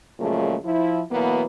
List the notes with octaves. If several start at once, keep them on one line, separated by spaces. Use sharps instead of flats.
A#2 C#3 F3 F#3 G#3 A3
F3 E4
B2 E3 F#3 A#3 B3